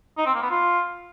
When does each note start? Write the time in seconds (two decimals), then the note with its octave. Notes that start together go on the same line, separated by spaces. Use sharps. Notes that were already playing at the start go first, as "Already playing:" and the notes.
0.18 D#4
0.26 C4
0.34 A#3
0.42 B3
0.51 F4